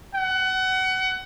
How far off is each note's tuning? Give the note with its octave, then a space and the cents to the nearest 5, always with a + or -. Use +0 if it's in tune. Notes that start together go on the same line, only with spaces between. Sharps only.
F#5 +25